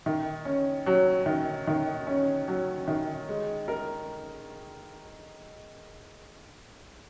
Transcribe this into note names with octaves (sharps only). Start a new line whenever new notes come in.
D#3
C#4
F#3
D#3
D#3
C#4
F#3
D#3
G#3
A#4